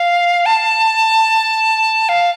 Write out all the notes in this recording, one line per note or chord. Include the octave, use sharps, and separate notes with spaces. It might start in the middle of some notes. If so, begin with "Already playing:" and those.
Already playing: F5
A5
F5